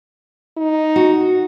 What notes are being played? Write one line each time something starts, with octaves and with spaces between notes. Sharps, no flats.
D#4
F#4